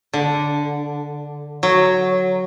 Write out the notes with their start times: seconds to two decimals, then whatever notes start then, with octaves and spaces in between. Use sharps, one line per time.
0.13 D3
1.63 F#3